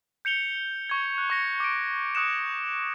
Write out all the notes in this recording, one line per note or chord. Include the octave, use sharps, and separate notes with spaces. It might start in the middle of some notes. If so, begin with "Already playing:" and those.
G6 C#7 F7 G7
C#6 G#6
F#6
C#6 A#6 C#7
D6 D7
C#6 D#6 F#6 C#7 E7